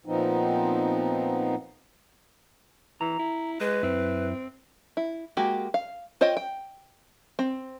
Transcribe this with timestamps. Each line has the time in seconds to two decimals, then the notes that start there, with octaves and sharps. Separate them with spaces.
0.06 A#2 F3 B3 C4 D#4
3.01 E3 A#5
3.19 E4
3.60 G#3 B4
3.83 F#2 C4 E4
4.97 E4
5.37 G#3 A#3 F#4 G4
5.74 F5
6.21 F4 C5 C#5 D#5 G5
6.37 G5
7.39 C4